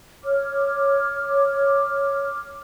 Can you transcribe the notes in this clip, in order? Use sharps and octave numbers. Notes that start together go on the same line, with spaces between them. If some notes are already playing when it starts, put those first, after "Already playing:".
C#5 D6 F6